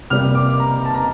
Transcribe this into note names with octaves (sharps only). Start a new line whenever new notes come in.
C3 G3 A#3 F6
D6
A#5
A5
A#5